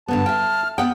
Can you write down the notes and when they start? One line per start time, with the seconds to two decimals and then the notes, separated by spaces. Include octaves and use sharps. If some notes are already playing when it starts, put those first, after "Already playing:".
0.08 G2 D3 B3 A5
0.26 E5 G5 F6
0.78 B3 F#5 G5 D#6